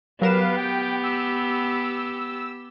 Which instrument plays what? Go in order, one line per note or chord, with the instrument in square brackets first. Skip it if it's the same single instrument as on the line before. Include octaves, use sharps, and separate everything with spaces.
[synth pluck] F#3 A#4 E7 [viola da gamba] B3 G4 [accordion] B4 F5
[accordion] G5
E6